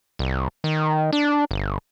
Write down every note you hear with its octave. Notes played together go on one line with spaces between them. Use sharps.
C2
D#3
D4
G1